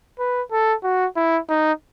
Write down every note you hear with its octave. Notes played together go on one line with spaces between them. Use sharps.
B4
A4
F#4
E4
D#4